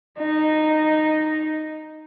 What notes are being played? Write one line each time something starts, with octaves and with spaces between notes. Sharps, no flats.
D#4